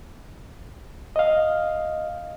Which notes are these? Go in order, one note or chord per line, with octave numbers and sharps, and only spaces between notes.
D#5 F5